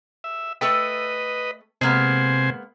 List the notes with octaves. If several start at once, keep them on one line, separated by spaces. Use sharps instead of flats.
E5
A3 A4 B4 D#5 G5
C3 G#3 A#3 B3 C5 G#5